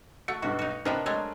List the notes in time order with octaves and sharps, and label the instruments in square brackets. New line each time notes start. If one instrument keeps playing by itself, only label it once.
[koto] A3 [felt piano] F#4 C#7
[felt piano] B1 G2 [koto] F#4
[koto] D#4 F#4
[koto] C3 F3 B3 [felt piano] D4 A#4 D#5
[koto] F#3 G#3 A3